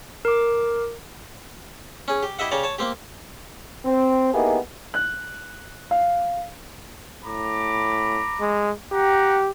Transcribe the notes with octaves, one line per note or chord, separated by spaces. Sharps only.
A#4 D6
C#4 G#4
G4
E4 G4 D#5 E5 F#5
C#3 G4 C#5 D5 A#5
C#5 A5
A#3 C4 G4
C4
A#3 B3 D#4 E4 G4 G#4
F#6
F5
A2 A#5 B5 D6
G#3
G4 F#5 G5 A#5